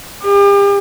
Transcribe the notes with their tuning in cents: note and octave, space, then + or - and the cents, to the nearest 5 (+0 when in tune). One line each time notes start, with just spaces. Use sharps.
G4 +40